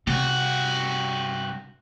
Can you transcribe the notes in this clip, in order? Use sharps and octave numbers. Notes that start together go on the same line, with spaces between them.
G2 C3 F#4